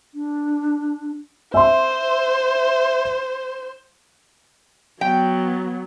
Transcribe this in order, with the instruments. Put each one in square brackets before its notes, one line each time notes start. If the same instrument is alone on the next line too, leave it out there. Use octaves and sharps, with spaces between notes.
[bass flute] D4
[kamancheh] C5 [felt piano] E5 C6
[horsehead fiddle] F#3 B3 [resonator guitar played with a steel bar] G5